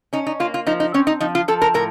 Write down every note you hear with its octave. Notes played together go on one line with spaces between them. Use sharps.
C#4 D#4
D#4
A#3 F4
F4
F3 D#4
D#4
C4 C#4
D#4
F3 D#4
F4
F3 A4
A#4
A2 A#4